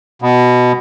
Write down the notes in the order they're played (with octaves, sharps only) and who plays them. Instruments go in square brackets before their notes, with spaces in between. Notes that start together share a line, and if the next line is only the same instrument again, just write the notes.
[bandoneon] B2